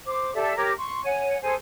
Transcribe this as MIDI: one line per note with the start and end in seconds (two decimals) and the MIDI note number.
0.05 0.34 72
0.05 0.34 86
0.34 0.56 67
0.34 0.56 69
0.34 0.56 74
0.34 0.56 76
0.56 0.71 67
0.56 0.71 70
0.56 0.71 73
0.56 0.71 86
0.77 1.00 84
0.77 1.00 85
1.04 1.36 73
1.04 1.36 78
1.04 1.36 80
1.42 1.53 68
1.42 1.53 69
1.42 1.53 72
1.42 1.53 80